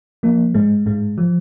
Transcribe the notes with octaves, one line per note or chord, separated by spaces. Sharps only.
F3 A#3
G#2 G#3
G#2 G#3
F3